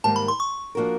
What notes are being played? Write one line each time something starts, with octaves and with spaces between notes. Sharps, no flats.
G#2 D#3 G3 A#3 A5
B5
C6
C#6
F3 A#3 D4 F#4 A#4